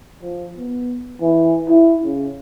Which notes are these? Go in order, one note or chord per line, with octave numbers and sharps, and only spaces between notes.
F3
B3
E3
E4
C#3